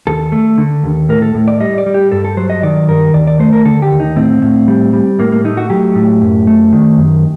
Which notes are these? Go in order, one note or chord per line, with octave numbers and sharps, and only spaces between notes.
D#2 A4
A3
D3
D#2
A2 A#4
A4
A2
D5
G3 D#5
D5
G3
G4
G2 A4
A4
F#3 C5
D#5
D#3 D5
G2 A#4
D#2 D5
D5
A3 C5
A#4
D3 A4
G4
D#2
D#4
A2 C4
A2
G3
G3
A2 A#3
A#3
A3 D#4
F#4
F#3 G4
A2
F#2
A3
D#3
F#2